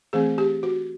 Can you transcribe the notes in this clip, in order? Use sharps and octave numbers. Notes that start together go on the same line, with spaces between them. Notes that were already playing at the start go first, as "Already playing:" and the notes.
E3 A3 C4 G#4
G4
F#4